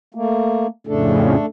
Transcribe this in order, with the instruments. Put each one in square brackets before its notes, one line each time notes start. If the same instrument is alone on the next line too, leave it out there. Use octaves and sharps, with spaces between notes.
[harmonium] A3 A#3
[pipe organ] F2 A2 C#3 [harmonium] A3 D4 A4